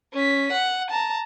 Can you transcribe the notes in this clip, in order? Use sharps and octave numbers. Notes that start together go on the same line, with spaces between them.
C#4 B6
F#5
A5 A#5